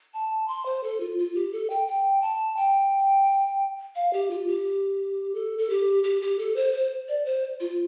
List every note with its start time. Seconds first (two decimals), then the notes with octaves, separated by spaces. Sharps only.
0.14 A5
0.48 C6
0.65 C5
0.83 A4
1.00 F4
1.18 F4
1.35 G4
1.53 A4
1.70 G5
1.87 G5
2.22 A5
2.57 G5
3.95 F5
4.13 G4
4.31 F4
4.48 G4
5.35 A4
5.58 A4
5.70 G4
6.04 G4
6.22 G4
6.39 A4
6.56 C5
6.73 C5
7.08 D5
7.26 C5
7.60 F4